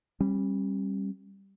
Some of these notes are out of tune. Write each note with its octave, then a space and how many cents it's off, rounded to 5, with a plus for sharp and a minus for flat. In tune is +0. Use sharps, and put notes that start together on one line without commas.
G3 +0 C#4 -40